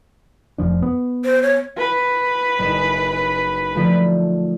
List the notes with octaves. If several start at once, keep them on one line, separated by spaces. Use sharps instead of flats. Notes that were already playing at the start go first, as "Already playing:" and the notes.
F1 F3 D4
B3
C5
C#5
B4
F#1 D#4 E7
D3 F3 A3